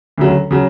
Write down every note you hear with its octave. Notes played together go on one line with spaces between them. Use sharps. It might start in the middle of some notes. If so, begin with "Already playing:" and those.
D2 C#3 F#3
C#3 F#3